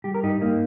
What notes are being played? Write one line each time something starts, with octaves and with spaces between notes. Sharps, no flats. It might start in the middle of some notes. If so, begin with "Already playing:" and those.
G3 G4
A#4
G2 D#4 G4
G2 A#3 D#4